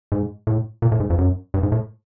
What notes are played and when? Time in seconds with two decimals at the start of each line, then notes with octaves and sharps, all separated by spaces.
0.12 G#2
0.47 A2
0.82 A#2
0.92 A2
1.00 G#2
1.10 F2
1.19 F#2
1.54 G2
1.63 G#2
1.72 A2